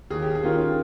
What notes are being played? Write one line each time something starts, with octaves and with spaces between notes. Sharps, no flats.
D#2 G#4
G4
G#4
D#3 A#3 C#4 F4